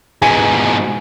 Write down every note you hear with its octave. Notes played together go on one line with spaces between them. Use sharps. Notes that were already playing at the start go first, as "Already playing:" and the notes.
G#2 B2 G#5